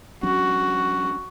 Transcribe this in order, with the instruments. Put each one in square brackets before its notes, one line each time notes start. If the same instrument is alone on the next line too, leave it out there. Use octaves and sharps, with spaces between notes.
[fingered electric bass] F#3 C#4 D4 [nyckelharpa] F#4